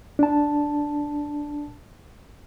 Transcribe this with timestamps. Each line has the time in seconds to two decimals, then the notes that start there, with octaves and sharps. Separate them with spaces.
0.19 D4 A5